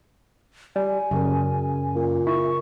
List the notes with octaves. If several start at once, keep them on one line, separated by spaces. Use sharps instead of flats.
G3 G#5
F#2 C#3 G#4 A#4
A#2
E4 C#6